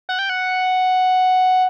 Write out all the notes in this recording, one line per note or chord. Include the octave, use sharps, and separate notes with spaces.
F#5
G5
F#5